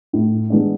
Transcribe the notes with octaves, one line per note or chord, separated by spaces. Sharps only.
A2
E3 G#3 B3 D4